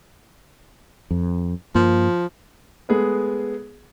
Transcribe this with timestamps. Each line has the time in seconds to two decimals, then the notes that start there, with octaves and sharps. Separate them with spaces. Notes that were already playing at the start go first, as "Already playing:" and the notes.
1.11 F2
1.75 G2 F3 A#3
2.89 G#3 A3 B3 G#4 A4 B4